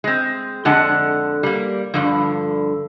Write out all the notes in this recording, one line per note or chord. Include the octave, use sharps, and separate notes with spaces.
G#3 C4
F2 D3 G#3 D4 F#5 A5
G3 A#3
G2 D3 F3